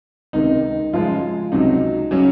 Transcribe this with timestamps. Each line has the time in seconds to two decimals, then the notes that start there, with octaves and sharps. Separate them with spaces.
0.33 C#2 C3 D#3 D#4
0.93 F#2 C#3 F3 G#3 F4
1.52 C#2 C3 F#3 D#4
2.11 C#3 F#3 C#4